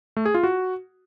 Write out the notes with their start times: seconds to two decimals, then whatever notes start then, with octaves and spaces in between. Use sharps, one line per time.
0.17 A3
0.26 G#4
0.34 F4
0.43 F#4